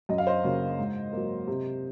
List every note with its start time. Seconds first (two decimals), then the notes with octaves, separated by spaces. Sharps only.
0.09 F#2 D#5
0.18 F5
0.27 C5 D#5
0.44 C#3 F#3 A#3
0.79 G#2
1.13 F#3 A#3
1.47 C3